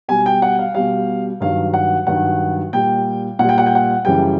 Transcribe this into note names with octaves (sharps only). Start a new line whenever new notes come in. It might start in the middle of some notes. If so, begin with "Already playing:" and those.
B2 G3 G#5
G5
F#5
F5
B2 G3 F5
G2 D#3 F#3 F5
F#5
G2 D#3 F#3 F#5
A#2 G3 G5
A#2 G3 F#5
G5
F#5
G5
F#5
F#2 C#3 E3 G3 G5